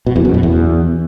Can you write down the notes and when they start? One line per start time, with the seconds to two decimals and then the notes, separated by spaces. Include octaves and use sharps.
0.07 B2
0.16 E2
0.25 F#2
0.34 B2
0.43 E2